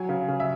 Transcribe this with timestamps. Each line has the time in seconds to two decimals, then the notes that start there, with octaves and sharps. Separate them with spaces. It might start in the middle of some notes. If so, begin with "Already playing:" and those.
Already playing: F#3 G#5
0.09 C#3
0.28 C#3
0.40 E5